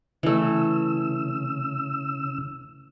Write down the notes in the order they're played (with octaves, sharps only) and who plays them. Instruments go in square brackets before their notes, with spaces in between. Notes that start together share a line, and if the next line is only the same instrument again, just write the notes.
[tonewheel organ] C#3 E6 [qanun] E3 A3